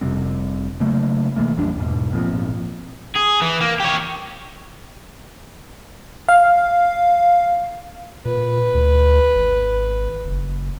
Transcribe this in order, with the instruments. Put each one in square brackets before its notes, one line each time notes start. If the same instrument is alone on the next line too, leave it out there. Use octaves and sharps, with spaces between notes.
[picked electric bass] F1 C3 G3 C4
C#3 F#3 A3 A#3
C3 E3 A3 A#3
A#1 F2 G3 D4
E2 G#2 B2
G#1 A#2 F3 C4
[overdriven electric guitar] G#4
E3
A#3
G4 C#5
[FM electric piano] F5
[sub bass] A#2 [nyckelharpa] B4
[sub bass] D2
G#1
F#1